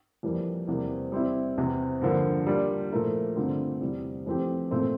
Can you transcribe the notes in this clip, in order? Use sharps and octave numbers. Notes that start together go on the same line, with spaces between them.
F2 E3 G3 A#3
E2 C3 G3 A#3
G3 C4 E4
E2 C3 E3
G2 D3 F3 A#3
G3 A#3 D4 F4
A#2 F3 A3 E4 A#4
G2 D3 A3 C4 F4
E2 C3 G3
F2 E3 A3 C4 G4
A#2 A3 C4